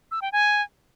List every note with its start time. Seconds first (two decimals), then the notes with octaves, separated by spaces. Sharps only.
0.11 E6
0.22 G5
0.32 G#5